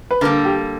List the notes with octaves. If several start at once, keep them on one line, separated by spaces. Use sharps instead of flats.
B4
D3 G3 A#3 A#4
G4